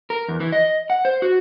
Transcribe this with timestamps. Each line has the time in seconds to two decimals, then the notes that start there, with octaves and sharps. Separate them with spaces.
0.10 A#4
0.28 E2
0.40 E3
0.52 D#5
0.90 F#5
1.05 C5
1.22 F#4